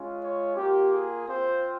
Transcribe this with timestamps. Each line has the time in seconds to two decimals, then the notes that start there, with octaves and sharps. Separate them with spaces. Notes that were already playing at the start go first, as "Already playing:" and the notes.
Already playing: G#3 C#4 F4
0.21 C#5
0.56 A#3 F4 G4
0.91 G#4
1.26 C4 F4 C5